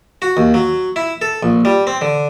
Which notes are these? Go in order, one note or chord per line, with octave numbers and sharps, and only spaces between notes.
F#4
D#2
F#3
E4
A4
A#1
G3
C4
D3